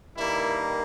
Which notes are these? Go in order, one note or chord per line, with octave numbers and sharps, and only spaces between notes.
G2 D#3 G3 A#3 E4